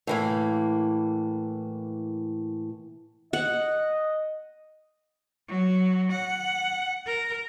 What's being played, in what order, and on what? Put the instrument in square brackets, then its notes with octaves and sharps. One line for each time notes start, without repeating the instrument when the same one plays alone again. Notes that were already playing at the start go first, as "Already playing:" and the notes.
[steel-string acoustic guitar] A2 E3 A#3
[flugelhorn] D#5 [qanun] F#5
[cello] F#3
F#5
A#4